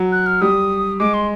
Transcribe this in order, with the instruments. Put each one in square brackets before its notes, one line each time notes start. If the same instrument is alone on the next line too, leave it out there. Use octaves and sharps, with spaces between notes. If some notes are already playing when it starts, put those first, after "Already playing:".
Already playing: [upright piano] F#3
[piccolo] F#6
F6
[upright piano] G3 [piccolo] D#6
[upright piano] G#3 [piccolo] D6
[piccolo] C6